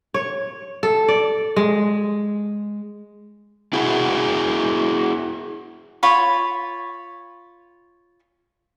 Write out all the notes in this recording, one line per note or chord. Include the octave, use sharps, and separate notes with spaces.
C#5
A4
D5
G#3
E4 F#4 G#4
F4 C#5 B5